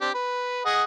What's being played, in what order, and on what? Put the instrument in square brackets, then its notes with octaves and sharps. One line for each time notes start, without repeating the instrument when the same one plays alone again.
[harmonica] C4 D4 G4
B4
G#4 D#5 F#5